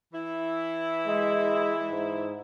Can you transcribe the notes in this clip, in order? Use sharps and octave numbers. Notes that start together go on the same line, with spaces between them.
E3 E4
G#3
G#2